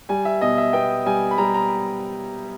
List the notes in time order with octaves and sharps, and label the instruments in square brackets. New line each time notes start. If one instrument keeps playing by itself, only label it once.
[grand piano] G3 G#5
E5
B2 D#5
E5
B3 G5
G3 G#5
B5
G3 A#5
A#5